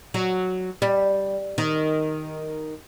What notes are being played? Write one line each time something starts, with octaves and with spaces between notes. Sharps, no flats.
F#3
G3
D#3